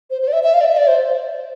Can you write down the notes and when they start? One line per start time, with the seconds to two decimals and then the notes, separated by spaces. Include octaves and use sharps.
0.10 C5
0.22 C5
0.28 D5
0.33 E5
0.44 E5
0.54 F5
0.61 D5
0.66 E5
0.77 D5
0.87 C5